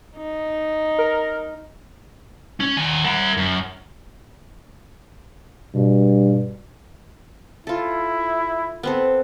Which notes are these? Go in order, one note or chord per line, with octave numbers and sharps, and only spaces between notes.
D#4
A#4
C#4
D#2 G#5
A#4 F#5
F#2
G2 B2
E4 F4 A4
B3 C4 A4